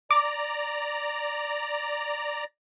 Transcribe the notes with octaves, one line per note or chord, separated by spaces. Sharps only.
D5 A#5 D6